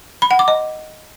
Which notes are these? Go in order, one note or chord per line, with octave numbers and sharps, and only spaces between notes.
B5
F#5
D6
D#5